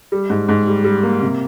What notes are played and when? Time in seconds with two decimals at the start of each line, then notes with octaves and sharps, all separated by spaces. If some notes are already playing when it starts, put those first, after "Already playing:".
0.12 G3
0.30 G#2
0.48 G#2
0.67 G3
0.84 G3
1.03 A#3
1.22 C3